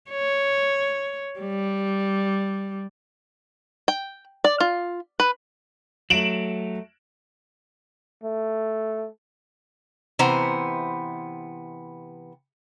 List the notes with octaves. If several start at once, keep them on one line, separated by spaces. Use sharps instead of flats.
C#5
G3
G5
D5
F4
B4
F#3 A3 D7 E7 F#7
A3
C3 E3 B3 C5 A#5